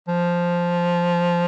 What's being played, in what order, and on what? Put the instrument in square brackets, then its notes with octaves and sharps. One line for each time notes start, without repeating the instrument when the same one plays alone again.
[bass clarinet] F3